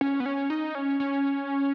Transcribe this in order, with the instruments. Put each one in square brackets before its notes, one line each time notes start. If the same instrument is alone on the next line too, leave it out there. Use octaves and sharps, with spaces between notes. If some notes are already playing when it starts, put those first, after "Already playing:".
[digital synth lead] C#4
B3
C#4
D#4
C#4
C#4